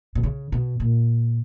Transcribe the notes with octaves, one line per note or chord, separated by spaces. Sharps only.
B2
C#3
B2
A#2